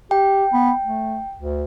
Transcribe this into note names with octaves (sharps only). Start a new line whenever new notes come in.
G4 G5
B3
A3
D2